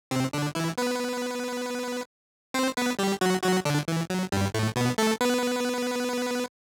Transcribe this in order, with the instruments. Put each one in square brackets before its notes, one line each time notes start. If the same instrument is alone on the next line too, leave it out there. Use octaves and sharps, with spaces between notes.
[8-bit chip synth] C3 C4
D3 D4
E3 E4
B3 B4
C4 C5
B3 B4
G3 G4
F#3 F#4
F#3 F#4
D3 D4
E3
F#3
G2 G3
A2 A3
B2 B3
A3 A4
B3 B4